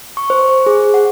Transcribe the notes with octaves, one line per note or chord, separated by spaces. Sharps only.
C#6
C5
G#4
F#5